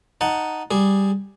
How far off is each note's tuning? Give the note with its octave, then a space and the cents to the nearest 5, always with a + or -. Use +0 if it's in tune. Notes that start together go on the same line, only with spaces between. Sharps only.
D#4 +0 F#5 +0 A5 +0
G3 +0 G#4 +0